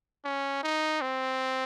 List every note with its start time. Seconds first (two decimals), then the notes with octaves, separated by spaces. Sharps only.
0.25 C#4
0.63 D#4
1.01 C4